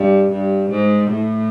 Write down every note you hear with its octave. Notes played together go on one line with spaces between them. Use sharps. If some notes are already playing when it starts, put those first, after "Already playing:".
Already playing: G2
G2
G#2
A2